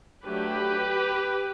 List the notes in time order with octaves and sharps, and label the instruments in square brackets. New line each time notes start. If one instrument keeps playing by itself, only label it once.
[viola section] F#3 A3 D4 G4 B4